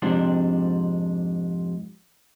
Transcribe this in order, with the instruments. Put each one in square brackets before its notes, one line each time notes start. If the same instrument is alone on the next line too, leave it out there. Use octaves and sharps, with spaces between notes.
[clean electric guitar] F2 G#2 C3 D4